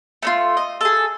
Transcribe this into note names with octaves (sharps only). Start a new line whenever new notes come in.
A3 D#4 F4
D#5
G#4 A4